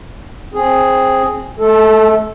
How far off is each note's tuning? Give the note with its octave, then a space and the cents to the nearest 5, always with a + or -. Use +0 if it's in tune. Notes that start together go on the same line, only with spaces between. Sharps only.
C4 +10 G#4 +0
A3 -35 A4 +0